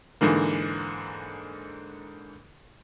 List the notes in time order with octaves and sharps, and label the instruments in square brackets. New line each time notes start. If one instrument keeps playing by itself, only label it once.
[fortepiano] G#2 D3 E3 A#3